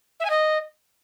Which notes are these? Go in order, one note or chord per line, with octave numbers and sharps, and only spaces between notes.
E5
G#5
D#5